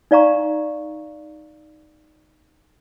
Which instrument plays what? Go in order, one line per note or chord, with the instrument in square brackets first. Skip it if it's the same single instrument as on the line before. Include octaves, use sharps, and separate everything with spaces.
[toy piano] D#4 D5 F5 A#5 C#6